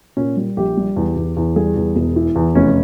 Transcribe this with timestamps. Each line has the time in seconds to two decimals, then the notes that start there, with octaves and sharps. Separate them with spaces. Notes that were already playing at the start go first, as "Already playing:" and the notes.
0.17 A#2 C#4
0.37 G3
0.57 A#1 G4
0.77 G3
0.96 E2
1.16 E2
1.37 E2
1.56 G3 G#4
1.76 E2
1.96 E1
2.16 E3
2.36 E2
2.55 F1 C#4